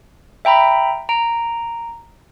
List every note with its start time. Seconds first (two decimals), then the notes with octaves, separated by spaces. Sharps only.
0.45 E5 G5 A#5 B5
1.09 A#5 D7